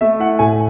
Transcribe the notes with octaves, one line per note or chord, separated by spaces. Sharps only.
A3 E5
E4 F#5
A2 G#5